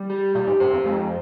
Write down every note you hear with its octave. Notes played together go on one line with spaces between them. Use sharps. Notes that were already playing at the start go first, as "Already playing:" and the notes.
Already playing: G3
G4
A#2 G4
G#2
G2 C5
F2
F2 G#3